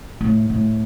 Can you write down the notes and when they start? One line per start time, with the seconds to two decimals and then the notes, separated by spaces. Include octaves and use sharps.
0.21 A2
0.50 A2